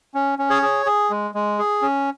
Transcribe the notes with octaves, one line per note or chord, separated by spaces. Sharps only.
C#4
C#4
G#4 C#5
G#4
G#4
G#3
G#3
G#4
C#4